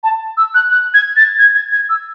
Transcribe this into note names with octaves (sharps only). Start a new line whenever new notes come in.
A5
E6
F#6
F#6
G#6
A6
G#6
G#6
G#6
E6